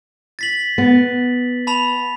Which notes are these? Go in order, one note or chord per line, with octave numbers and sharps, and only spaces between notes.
A6 B6 F#7
B3
A5 B5 F7